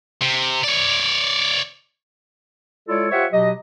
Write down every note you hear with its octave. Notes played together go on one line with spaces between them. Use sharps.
C3
C#5 D5
G#3 E4 F4 A4 C#5 D5
F4 G4 C5 C#5 E5 F#5
B2 F#3 G4 D#5